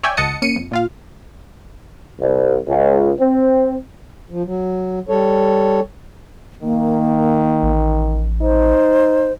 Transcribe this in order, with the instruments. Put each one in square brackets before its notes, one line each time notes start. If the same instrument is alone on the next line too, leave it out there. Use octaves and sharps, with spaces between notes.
[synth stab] C#5 D5 E5 G5 G#5
C#2 D#5 F#5 A5 D#6 C#7
A#3 C#4 C#7 D#7
F2
A#2 F4 F5
[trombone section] C2
C#2
C4
[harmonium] F3
F#3
G3 A4 C#5
[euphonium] D#3 [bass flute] A#3
[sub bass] A1
[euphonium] D#4 [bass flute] C5